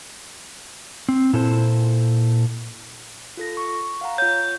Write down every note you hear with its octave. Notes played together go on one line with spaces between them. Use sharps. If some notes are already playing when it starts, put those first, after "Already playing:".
C4
A#2 E4 A4 C5
F4 A4 A#6
C#6
F5 F#5 A#5
F4 C#5 G6